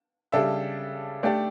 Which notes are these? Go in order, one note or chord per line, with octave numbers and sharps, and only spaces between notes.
C#3 G3 D4 A4 E5
A3 D4 G4 D5